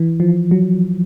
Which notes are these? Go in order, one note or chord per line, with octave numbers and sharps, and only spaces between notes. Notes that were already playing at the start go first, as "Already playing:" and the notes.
Already playing: E3
F3
F#3